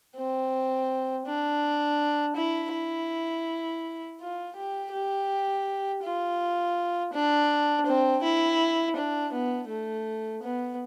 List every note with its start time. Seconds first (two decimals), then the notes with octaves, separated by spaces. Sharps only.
0.17 C4
1.26 D4
2.36 E4
2.73 E4
4.20 F4
4.56 G4
4.93 G4
6.03 F4
7.13 D4
7.87 C4
8.23 E4
8.96 D4
9.32 B3
9.68 A3
10.43 B3